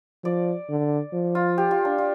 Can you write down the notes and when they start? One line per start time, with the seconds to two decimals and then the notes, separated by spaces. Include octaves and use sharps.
0.24 F3 D5
0.69 D3
1.13 F3
1.35 F4
1.58 G4
1.71 F4
1.85 D4
1.98 F4